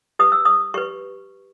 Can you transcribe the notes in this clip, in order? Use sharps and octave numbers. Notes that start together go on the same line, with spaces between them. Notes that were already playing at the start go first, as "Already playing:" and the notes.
G4 B4 D#6
E6
D#6
G4 B4 C#6